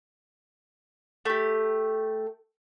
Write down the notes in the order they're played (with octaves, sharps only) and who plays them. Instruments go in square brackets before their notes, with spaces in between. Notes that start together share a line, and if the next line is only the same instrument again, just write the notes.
[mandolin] A3 G4